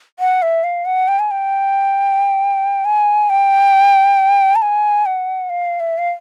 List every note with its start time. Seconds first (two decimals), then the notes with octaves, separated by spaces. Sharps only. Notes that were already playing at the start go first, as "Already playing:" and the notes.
0.19 F#5
0.42 E5
0.64 F5
0.85 F#5
1.08 G5
1.19 G#5
1.31 G5
2.85 G#5
3.30 G5
4.56 A5
4.62 G#5
5.06 F#5
5.50 F5
5.80 E5
5.98 F5